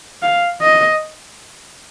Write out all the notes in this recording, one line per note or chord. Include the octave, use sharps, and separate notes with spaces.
F5
D#5